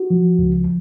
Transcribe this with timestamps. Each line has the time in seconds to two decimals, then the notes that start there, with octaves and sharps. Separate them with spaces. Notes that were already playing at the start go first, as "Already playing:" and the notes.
Already playing: F#4
0.10 F3
0.39 C#2